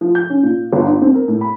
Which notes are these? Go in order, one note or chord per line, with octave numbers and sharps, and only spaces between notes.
F3
G6
C#4
A#2
G1
D4
C4
A#4
A2
B5